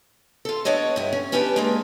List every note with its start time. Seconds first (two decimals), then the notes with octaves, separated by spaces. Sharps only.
0.45 F4 A4
0.65 B3 D4 C#5 D#5
0.96 G2 E4
1.13 C#4
1.32 B3 C#4 D4 G4 B4 G5
1.56 G#3 A#3 D4